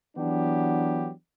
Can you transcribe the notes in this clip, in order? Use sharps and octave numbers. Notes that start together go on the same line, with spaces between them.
E3 F#3 B3 D4 G4